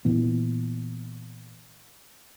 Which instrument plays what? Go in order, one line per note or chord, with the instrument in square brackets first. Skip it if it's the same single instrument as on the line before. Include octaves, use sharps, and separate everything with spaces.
[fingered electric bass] A#2 E3 B3